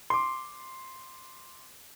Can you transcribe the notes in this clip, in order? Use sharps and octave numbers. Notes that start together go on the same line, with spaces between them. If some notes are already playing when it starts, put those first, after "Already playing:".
C6 D6